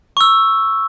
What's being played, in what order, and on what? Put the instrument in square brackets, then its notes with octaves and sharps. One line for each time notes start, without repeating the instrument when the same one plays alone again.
[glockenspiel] C#6 E6